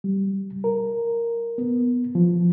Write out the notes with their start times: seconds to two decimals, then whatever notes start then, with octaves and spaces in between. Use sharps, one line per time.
0.04 G3
0.64 A#4
1.58 B3
2.15 F3